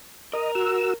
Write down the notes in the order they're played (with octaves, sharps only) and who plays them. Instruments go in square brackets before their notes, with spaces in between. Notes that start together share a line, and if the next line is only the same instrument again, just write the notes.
[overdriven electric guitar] A#4 [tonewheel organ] D#5
[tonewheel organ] F#4 E6